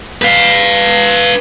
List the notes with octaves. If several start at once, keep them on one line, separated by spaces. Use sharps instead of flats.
B4 F5